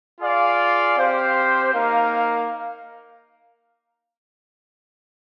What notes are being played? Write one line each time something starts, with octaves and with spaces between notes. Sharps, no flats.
F4 G#4 D5 F5
C4 G4 C5 F5
A#3 D#4 A#4 F5